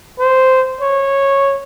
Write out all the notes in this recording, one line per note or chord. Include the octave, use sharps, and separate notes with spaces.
C5
C#5